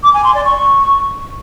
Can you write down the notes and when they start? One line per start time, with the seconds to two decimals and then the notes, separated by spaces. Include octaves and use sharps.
0.03 D6
0.14 G#5
0.24 C6
0.35 D5
0.45 C#6